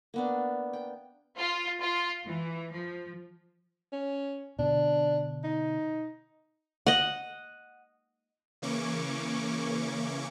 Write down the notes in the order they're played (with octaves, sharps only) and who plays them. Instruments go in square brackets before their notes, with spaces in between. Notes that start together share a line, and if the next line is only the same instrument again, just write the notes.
[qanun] A#3 B3 D4
G5
[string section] F4
F4
E3
F3
[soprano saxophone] C#4
[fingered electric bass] B2 D3 [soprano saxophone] D4
[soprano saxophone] D#4
[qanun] D#5 F#5
[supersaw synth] C#3 E3 A#3 C#4 C#6 D6